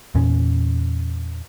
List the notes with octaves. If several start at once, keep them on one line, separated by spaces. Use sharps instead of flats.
E2 A#2 C#4